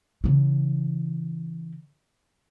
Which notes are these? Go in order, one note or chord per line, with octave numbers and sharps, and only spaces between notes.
C#3 E3